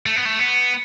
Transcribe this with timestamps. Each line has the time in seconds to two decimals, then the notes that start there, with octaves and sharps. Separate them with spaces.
0.06 A3
0.16 B3
0.25 A3
0.39 B3